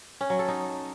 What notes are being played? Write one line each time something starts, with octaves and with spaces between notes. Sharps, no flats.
C#4
F#3
A4
D#4